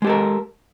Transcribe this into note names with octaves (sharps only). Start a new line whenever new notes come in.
G#3 G4 A4 A#4